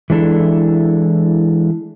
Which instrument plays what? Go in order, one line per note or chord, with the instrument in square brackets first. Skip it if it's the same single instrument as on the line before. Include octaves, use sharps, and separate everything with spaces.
[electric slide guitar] E3 G#3 D4 E4 A4